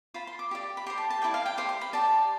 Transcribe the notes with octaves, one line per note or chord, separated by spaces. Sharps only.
F4 C5 B5
C6
D6
G4 D5
B5
G4 C5 C6
A5
A5
E4 A4 D5 G5
F5
G5
G4 C5 C6
C6
B5
G4 D5 A5